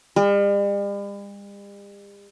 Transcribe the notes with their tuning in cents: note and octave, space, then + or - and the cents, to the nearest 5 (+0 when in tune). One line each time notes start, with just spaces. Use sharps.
G3 +45